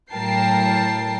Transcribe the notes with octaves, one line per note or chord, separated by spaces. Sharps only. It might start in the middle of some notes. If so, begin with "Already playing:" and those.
A2 F#3 A#4 G5 A5 C7